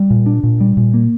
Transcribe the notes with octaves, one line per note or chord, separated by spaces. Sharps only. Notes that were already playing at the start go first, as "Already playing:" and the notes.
Already playing: G3
A#2
D4
A#2
G3
A#2
A#3